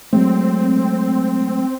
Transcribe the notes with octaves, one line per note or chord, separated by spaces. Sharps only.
F#3 G#3 A3 C4